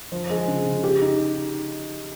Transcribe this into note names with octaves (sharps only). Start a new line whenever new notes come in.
F3
G#3
C#3
C#3
G4
D#4